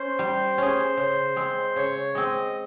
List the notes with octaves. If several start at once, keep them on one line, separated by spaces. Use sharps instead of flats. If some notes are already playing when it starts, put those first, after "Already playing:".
Already playing: C#4 C5
G3
C#4 G#4
C#3
G#3 C4
C#3 C#5
G#3 C4 D#5